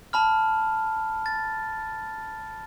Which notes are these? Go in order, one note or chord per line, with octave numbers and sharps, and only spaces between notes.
A5 B5 F6
A6